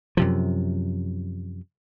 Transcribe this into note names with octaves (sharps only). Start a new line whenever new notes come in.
F#2 C3 F3